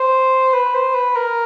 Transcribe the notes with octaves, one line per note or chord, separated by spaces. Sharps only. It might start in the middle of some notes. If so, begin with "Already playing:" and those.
Already playing: C5
B4
C5
B4
A#4